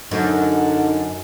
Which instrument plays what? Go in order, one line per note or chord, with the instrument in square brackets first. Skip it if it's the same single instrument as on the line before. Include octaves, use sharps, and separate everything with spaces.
[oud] F#2 [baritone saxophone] D3 [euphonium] D#4